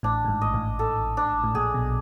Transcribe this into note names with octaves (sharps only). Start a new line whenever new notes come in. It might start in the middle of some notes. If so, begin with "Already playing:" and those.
A1 A2 D4
A2
G#1 G#2
D#5
A1 A2
A4
D4
A2
A#1 A#2 G#4
B1 B2